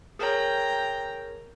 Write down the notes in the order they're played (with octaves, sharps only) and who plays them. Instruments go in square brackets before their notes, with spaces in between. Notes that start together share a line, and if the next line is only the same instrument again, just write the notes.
[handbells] G#4 A#4 C#5 [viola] G5 A#5